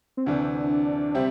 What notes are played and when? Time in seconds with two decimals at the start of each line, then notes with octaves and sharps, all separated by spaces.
0.17 C4
0.26 D2 C3 E3 D4
1.15 C3 G3 C4 E4 G4